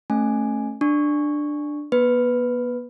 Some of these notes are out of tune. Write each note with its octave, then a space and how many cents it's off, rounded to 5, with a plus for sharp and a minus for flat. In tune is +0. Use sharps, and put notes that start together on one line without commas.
A3 +0 C#4 -25 G#5 +0
D4 +10 C#6 +0
B3 -40 B4 +0